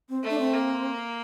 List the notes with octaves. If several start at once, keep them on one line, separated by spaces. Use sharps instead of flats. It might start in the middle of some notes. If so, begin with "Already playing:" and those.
C4
A3
D4
C4
A#3